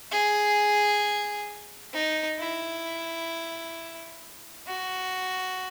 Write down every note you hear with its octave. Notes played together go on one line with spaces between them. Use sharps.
G#4
D#4
E4
F#4